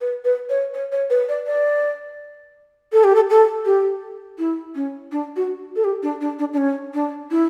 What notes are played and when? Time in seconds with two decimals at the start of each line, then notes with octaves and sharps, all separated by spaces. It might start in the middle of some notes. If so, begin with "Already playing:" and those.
0.01 B4
0.25 B4
0.50 C#5
0.74 C#5
0.92 C#5
1.10 B4
1.29 D5
1.47 D5
2.93 A4
3.04 G4
3.15 A4
3.30 A4
3.66 G4
4.38 E4
4.75 C#4
5.12 D4
5.36 F#4
5.76 A4
5.84 G4
6.03 D4
6.21 D4
6.39 D4
6.53 D4
6.57 C#4
6.94 D4
7.31 E4